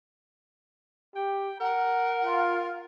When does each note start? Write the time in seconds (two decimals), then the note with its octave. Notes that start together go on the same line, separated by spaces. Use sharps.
1.16 G4 G5
1.60 A#4 F#5 A#5
2.22 F4